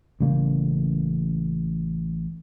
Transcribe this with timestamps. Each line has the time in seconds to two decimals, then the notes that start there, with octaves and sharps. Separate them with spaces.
0.20 A1 C#3 G3 A#3